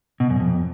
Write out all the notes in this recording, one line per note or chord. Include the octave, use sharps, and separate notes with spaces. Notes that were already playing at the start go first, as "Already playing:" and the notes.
B2
F#2
F2